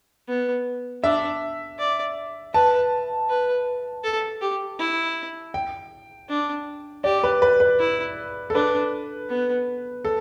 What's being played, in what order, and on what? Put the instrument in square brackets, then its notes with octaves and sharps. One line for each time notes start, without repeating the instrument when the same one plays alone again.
[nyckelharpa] B3
[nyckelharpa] D4 [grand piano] E5
[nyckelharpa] D5
[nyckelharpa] B4 [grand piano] A5
[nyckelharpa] B4
A4
G4
E4
[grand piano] G5
[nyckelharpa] D4
[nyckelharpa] G4 [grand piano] D5
[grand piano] B4
B4
B4
[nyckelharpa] E4
[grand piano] A4
[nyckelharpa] D4 [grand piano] B4
[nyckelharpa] B3
[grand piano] A4